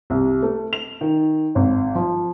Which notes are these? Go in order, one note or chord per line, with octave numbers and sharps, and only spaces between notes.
C2
A3
F7
D#3
G#1
F3